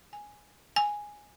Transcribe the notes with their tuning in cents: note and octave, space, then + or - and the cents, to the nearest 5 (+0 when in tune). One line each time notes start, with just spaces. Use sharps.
G#5 +0
G#5 +0